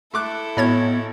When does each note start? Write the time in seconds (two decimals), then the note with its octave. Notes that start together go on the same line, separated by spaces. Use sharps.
0.14 A3 E4 A4 D6 F#6
0.57 G#1 A2 B3 C#5 B5 G#6